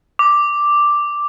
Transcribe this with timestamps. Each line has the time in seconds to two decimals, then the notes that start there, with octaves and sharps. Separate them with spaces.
0.19 D6